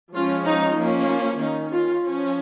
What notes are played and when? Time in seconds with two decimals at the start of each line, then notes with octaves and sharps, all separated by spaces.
0.15 F3 G#3 C#4 F4
0.46 D#4
0.78 F3 A#3 C#4
1.10 F4
1.40 D#3 C#4 D#4
1.72 F4
2.04 F3 C#4